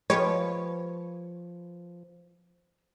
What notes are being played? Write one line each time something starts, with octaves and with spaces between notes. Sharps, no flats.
F3 G#3 G4 B4 C#5